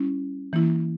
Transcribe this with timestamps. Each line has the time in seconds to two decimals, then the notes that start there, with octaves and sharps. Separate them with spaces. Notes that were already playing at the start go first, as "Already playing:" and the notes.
Already playing: G3 C#4 E4
0.53 E3 A#3 E4